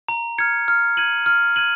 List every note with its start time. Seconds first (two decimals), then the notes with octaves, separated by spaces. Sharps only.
0.08 A#5
0.38 F6 G#6 C#7
0.68 F6
0.97 G#6 D#7 F#7
1.26 F6
1.56 G#6 D#7 F#7